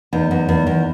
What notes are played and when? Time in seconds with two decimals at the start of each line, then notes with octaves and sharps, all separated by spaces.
0.13 E2 D#4
0.31 E2
0.49 E2
0.67 E2